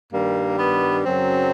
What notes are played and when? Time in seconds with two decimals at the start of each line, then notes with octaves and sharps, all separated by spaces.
0.12 G2 D#3 G3 A#3
0.58 B3
1.05 F#2 C#3 F#3 C4